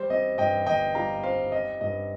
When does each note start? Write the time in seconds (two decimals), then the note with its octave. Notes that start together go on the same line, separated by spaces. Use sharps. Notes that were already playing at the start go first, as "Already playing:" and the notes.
Already playing: G3 C5
0.10 C4 D#5
0.38 G2 D#5 G5
0.66 G1 D#5 G5
0.95 G3 F5 A#5
1.23 C4 C5 F5
1.52 C4 D#5
1.81 G2 D#5